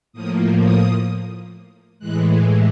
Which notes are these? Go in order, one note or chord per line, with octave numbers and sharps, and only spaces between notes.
A2 F3 A#3 D#6
D#6
A2 E3 G#3 F#6